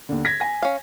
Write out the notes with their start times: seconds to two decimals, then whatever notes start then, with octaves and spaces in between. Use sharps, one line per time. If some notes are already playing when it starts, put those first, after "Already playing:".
0.09 D#2 D3
0.25 G#6 A#6 B6
0.40 G#5 A#6
0.62 C#4 F5